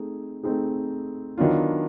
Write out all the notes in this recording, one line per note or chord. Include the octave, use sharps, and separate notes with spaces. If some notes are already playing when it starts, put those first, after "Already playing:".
Already playing: A3 C4 D#4 G#4
A3 C4 D#4 G#4
D#3 F#3 B3 D4 F4